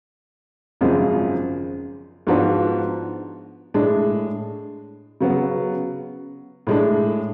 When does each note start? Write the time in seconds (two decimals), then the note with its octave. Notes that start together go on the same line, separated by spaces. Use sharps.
0.81 G#1 F#2 C#3 F3 G#3
2.27 G#2 F3 B3 D4 F#4
3.74 A2 G#3 D4
5.21 C#3 F#3 B3
6.67 A2 G#3 D4